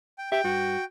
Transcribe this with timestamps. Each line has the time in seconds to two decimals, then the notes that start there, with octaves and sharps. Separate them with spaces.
0.18 G5
0.32 G4 E5 G5
0.44 G2 F#4